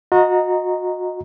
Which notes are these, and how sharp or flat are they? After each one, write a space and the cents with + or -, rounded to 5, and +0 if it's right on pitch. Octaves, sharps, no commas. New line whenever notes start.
F#4 -30 D#5 +0 A#5 -5